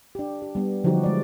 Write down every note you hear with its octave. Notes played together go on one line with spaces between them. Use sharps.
D4 G4
G4
G3 B3
D3 F3 F#3 D#4 F#4 G4
G#3 D5